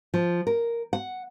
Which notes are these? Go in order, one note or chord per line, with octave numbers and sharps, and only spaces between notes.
F3
A#4
F#5